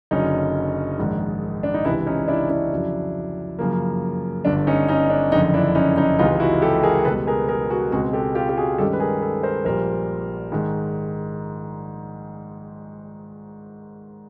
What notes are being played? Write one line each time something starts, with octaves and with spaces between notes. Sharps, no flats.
F#1 F#2 D3 F#3 C#4 D#4
A#1 G#2 D#3
D4
D#4
C#2 C3 E3 D4 E4
C#4 D#4
D4 E4
D4 E4
F2 C#3 F#3
F#2 C#3 F3 A#3
G1 G2 D3 D4
C#4 D#4
C#4 D#4
D4
F#1 F2 D3 C#4 D#4
D4 E4
C#4 D#4
C#4 D#4
C#2 C3 E3 G#3 D#4 F4
E4 F#4
G4 A4
G#4 A#4
C#2 B2 G3 B3 A4 B4
G#4 A#4
G#4 A#4
F#4 G#4
C#2 B2 G#3 C4 F#4 G#4
G4 A4
F4 G4
G4
F#4 G#4
G2 D#3 G#3 C#4 G4 A4
B4
G#4 A#4
A4 B4
A#4 C5
A#1 A#2 G3 A#4 C5
G#2 D#3 G#3